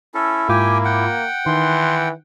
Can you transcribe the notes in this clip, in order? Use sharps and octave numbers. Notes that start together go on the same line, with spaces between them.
C#4 E4 A4
G#2 A#3 F4 G4 G5 G#5 D6
F#5 G5
D#3 E3 C6